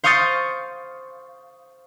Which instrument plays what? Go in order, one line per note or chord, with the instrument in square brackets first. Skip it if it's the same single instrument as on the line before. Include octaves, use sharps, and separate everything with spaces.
[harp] C5 F5 C#6 D#6 G6 A6